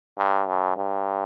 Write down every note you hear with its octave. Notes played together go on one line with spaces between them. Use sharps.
G2
F#2
G2